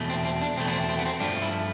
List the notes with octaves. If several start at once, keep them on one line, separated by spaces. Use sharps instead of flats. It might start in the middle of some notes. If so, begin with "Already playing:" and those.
Already playing: E2 B2 A3
C4
C4
D4
E2 B2 A3 C4
B3
C4
C4
B3
C4
G2 F3 A3 D4
E4